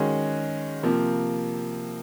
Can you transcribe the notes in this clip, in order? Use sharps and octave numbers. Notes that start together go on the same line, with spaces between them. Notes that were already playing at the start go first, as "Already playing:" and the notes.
Already playing: D#3 G#3 C#4 F#4 G#4
C3 F3 A#3